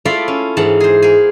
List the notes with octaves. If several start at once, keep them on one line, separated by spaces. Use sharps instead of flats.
A3 E4 F4 D5 F5 B5
C#4
G#2 E3 F#5 A5
G#4 C5
A#3 G#4